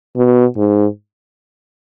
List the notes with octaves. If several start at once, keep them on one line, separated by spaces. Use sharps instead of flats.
B2
G#2